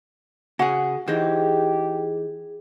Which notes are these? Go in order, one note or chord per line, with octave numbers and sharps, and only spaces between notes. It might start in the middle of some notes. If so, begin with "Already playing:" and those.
C#3 F#4 G#4 F#5
E3 D#4 G4 G#4 C5